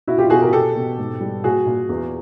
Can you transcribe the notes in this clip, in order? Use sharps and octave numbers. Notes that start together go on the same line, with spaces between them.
B2 E4 F#4
F4 G4
B2 F#4 G#4
G#4 A#4
B2 G4 A4
B2
G#2
G3
A#2 F#4 G#4
A#2
E2